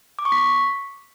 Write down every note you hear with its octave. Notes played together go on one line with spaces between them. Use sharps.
D6
C#6
B6